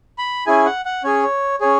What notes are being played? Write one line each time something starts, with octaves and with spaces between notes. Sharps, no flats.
B5
C#4 E4 G#4 G#5
F#5
F#5
C#4 G#4 C#5
C#4 G#4 C#5